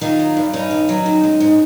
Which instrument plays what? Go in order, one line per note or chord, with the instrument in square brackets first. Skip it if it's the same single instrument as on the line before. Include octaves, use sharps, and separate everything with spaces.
[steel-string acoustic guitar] D#3 D#4 F4
F#3
G2
G2 C#4 D#4
D#3
F#3
D#3
G#3
G#2